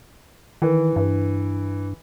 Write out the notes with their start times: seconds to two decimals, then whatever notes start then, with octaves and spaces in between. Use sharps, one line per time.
0.62 D#3 E3
0.96 G2